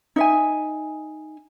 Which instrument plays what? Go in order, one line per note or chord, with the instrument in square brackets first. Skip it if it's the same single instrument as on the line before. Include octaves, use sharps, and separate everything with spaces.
[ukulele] D#4 E5 G#5